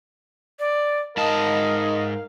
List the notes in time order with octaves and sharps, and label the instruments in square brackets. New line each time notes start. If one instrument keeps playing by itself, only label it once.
[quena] D5
[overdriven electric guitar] G#2 A5 [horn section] A#4 F5 [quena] D#5